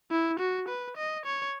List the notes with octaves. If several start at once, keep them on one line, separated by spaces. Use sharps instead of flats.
E4
F#4
B4
D#5
C#5